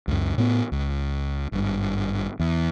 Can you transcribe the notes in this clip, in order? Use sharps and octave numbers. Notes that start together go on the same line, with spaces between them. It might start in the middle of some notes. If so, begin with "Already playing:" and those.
C#2 F#2
A2 B3
C#2
G#1 G2
E2